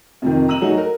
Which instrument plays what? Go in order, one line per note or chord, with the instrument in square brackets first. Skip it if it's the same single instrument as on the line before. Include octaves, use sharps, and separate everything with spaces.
[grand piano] F2 C3 D#3
A#5 E6 D#7 F#7
F#3 A3 D#4 F#4 G#4
A#4